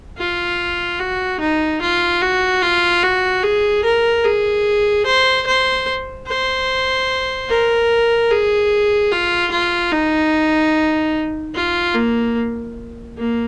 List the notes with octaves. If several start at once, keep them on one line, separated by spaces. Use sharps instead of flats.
F4
F#4
D#4
F4
F#4
F4
F#4
G#4
A#4
G#4
C5
C5
C5
A#4
G#4
F4
F4
D#4
F4
A#3
A#3